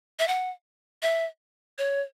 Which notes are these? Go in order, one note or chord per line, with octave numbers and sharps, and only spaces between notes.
E5
F#5
E5
C#5